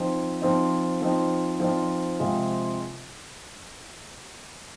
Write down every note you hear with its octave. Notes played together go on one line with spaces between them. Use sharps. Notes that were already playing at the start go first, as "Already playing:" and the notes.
Already playing: F3 C4 D#4
F3 C4 D#4
F3 C4 D#4
F3 C4 D#4
C3 F3 G#3 C4 F4